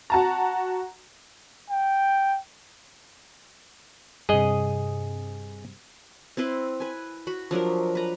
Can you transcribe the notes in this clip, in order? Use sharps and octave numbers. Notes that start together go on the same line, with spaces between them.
F#4 A5 A#5
G5
G2 C3 G#4 D#5
C4 E4 B4 C6
B4 G#5
F#4 B5
F3 F#3 D4 A#4
B4 A#5